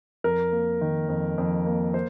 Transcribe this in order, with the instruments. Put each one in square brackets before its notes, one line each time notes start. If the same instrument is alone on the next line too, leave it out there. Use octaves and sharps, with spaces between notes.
[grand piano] F2 A#4
A#3
D#3
F2
F2
A#3
C5